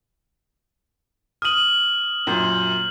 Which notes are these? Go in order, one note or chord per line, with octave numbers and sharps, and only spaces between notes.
D#6 F6 D#7 F#7
F#2 A#2 G6